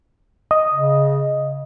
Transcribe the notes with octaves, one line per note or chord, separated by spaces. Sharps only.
D#5
C#3